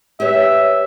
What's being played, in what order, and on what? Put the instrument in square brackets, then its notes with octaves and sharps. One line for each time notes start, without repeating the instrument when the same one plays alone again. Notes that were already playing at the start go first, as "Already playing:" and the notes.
[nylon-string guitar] G4 B4 C#5 [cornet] E5